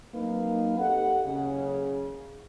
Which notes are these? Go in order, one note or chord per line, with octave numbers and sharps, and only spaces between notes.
F#3 A#3 C4 D#4 B4 F5
G4 A4 D#5 F#5
F#1 C#3